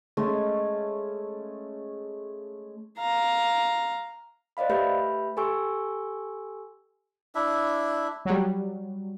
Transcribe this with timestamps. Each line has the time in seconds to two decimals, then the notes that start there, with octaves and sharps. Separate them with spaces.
0.17 G#3 A3 C#4
2.99 F5 A#5
4.57 C5 D5 D#5 F5 B5
4.69 A3 G4 B4 E5 B5 G6
5.37 G4 A4 G#5 C6 C#6 E6
7.35 D4 E4 E5
8.25 F#3 G3